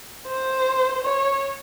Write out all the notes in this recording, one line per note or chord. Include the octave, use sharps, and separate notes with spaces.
C5
C#5